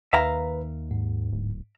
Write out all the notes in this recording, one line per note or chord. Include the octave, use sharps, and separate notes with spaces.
D#2 B4 E5 F5 A#5
G#2
D1